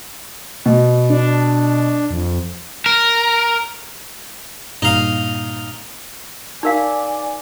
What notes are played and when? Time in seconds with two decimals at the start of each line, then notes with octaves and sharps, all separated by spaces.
0.66 B2
1.10 D4
2.11 F2
2.86 A#4
4.82 G2 A#2 D#4 F5
6.63 D#4 A#4 D5 F5 G#5